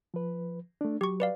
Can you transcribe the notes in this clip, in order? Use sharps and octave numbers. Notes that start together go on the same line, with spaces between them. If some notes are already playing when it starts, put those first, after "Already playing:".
F3 B4
A3 D4
F#3 G4 C#6
B4 D5 F5